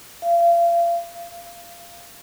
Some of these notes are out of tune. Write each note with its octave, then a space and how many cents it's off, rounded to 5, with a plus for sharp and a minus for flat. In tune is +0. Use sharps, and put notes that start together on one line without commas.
F5 -35
F5 -15